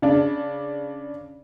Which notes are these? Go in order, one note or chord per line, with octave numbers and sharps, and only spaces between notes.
C#3 D4